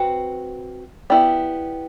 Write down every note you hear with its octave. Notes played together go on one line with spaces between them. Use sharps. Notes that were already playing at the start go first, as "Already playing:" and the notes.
Already playing: C4 F#4 B4
B3 E4 G4 D5